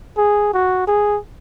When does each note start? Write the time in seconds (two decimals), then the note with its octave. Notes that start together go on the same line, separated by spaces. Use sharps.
0.18 G#4
0.53 F#4
0.87 G#4